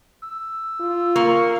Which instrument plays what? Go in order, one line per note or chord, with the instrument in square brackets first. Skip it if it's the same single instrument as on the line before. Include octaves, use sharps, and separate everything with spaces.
[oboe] E6
[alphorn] F4
[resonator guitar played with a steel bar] A#3 [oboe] C#6